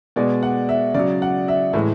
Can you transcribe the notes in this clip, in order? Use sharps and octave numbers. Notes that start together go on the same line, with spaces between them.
B2 G#3 D5
F#5
E5
C#3 F#3 D5
F#5
E5
A2 E3 G#3